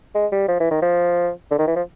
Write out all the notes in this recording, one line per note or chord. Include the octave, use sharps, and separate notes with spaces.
G#3
G3
F3
E3
D#3
F3
D3
D#3
E3
F3